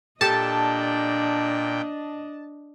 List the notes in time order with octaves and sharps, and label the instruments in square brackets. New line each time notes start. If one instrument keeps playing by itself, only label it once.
[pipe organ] A#2 G5 [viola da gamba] D4 D#5 [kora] G4 A4 [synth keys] A5